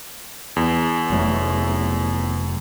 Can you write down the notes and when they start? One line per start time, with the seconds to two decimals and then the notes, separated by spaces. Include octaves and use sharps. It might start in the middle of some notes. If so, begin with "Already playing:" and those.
0.56 E2
1.10 F1 F#3 A3